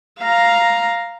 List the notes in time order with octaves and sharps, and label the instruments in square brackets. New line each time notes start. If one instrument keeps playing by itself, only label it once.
[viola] F5 A#5